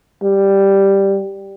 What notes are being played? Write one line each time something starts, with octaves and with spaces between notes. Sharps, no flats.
G3